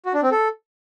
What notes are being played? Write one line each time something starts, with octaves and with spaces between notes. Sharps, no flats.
F#4
D4
C4
A4